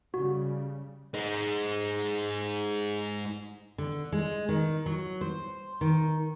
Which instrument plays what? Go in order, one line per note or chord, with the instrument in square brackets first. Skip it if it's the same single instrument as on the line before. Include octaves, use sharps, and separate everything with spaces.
[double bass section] C#3 G3 [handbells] F#4
[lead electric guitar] G#3 D#4
[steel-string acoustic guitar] D3
G#3
D#3
F#3
C5
D#3